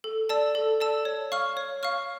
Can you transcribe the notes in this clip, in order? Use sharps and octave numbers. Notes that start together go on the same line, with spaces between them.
A4
D5 A5 E6
A4
D5 A5 E6
C#5
F5 C#6 F6
C#5
F5 C#6 F6